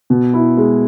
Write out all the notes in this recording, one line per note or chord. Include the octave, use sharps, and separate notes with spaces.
B2
E4
G#3